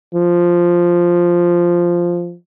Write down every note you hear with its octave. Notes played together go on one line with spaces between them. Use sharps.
F3